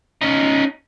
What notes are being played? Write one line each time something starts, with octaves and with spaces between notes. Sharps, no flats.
C#4 D#4